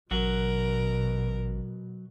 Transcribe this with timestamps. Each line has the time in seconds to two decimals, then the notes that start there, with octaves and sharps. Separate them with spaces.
0.11 A1 B2 F#3 F#4 A#4